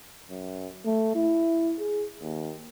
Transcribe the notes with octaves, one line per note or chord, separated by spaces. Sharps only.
F#2
A3
E4
G#4
D#2